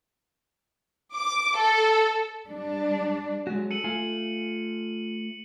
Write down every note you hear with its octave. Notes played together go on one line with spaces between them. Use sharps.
D6
A4
G3 D4
F#3 G#3 C#4 F#4
A4 C#7 D#7 F#7
A3 F4 G#5